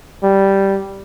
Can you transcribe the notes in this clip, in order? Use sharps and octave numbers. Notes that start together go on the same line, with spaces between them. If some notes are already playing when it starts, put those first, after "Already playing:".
G3